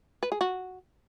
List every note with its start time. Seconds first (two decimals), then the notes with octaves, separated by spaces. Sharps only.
0.23 B4
0.32 G#4
0.41 F#4